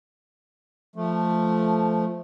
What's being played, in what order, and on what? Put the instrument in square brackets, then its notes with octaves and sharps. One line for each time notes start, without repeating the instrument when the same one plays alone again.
[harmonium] F3 A3